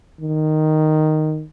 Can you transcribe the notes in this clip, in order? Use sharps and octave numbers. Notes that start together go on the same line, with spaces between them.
D#3